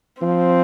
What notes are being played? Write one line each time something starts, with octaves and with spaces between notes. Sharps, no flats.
F3 C4